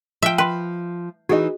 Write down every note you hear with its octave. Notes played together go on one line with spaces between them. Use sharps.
F3 E5 G5
B4 G5 C6
E3 D#4 F#4 G#4 D#5